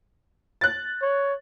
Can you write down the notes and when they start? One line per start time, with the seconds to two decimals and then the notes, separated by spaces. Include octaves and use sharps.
0.61 F#6 A6
1.02 C#5